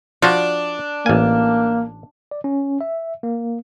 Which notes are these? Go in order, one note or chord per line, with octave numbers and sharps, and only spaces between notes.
F3 D4 F4 F#4
A1 A#3 G#5
D5
C#4
E5
A#3